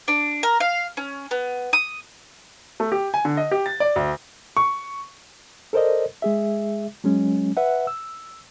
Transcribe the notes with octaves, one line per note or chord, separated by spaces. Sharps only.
D4
A#4
F5
C#4
B3
D#6
A3
G4
G#5
D3
D#5
G4
A6
D5
D2
C#6
A4 A#4 C5 D5 D#5
G#3 G#4 E5
F#3 G#3 C#4
B4 E5 F#5
E6